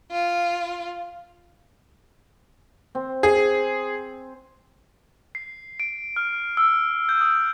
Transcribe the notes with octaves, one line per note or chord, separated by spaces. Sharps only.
F4
C4
G#4
C7
D7
F6
E6
G6
D#6